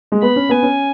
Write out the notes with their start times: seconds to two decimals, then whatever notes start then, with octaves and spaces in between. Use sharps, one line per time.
0.12 G#3
0.22 B3 B5
0.36 C#4
0.49 B3 G#5
0.63 C#4